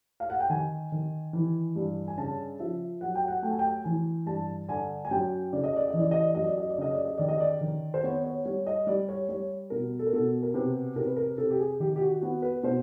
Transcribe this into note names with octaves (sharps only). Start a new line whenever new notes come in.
F5
F#5
G5
D#3 G#5
D#3
E3
G2
G#5
C#3 A5
F3 E5
F#3 F#5
G5
F#5
A3 G5
G#5
G5
E3 G#5
G2 A5
D3 G#5
G#5
F#2 G5
C#3 D5
D#5
D5
D#5
E3
D5
D#5
D5
F#2 D#5
D5
D#5
D5
C#3 D#5
D5
D#5
D#3 D5
D#5
D5
D#3
C5
B3 C#5
C#5
G3 C#5
D#5
G3 D5
C#5
G3 C#5
B2 A#4
A4
A#4
B2 A4
A#4
C3 B4
C3 A#4
B4
A#4
C3 A4
G4
G#4
D#3 G4
G4
F#4
B3 F#4
B4
B2 C5